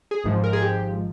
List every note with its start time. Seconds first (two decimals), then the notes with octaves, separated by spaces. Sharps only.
0.11 G#4
0.24 G#1 G#2 F3
0.44 A#4
0.53 G#4
0.62 G4